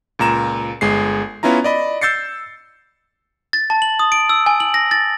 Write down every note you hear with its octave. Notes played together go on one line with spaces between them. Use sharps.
C#2 A#2 A#5 E7
G1 G#3 C7
B3 C#4 E4 F4 A#5
D5 D#5 B5
E6 G6 A6 C7 C#7
A6
A5
F#7
D#6
D7
E6
G#5
F#7
A#6
A6